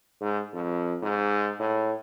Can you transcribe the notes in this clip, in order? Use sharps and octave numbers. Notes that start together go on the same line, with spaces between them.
G#2
F2
G#2
A2